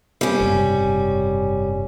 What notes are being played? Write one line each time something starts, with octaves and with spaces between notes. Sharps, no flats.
G3 C#4
F#1 G#2 C3